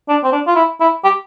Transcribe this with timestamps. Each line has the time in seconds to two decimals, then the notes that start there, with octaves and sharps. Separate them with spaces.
0.09 D4
0.24 C4
0.32 D4
0.47 F4
0.56 E4
0.80 E4
1.04 G4